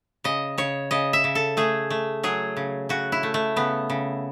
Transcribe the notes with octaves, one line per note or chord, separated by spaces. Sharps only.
C#3 D#5
C#3 C#5
C#3 D#5
E5
C#3
A4
A3 G#4
A3
F#3 G#4
C#3
C#3 F#4
E4
A3
A3
C#3 B3
C#3